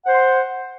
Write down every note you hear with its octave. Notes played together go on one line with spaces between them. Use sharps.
C5 F#5 C6